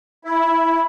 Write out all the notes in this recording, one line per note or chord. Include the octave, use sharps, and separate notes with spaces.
E4